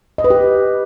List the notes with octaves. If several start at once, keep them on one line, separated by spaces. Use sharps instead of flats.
D#5
B4
G4